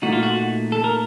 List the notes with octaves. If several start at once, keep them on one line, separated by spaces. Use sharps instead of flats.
A#2 A3 D#4 F#4
F4
F#4
A4
A#4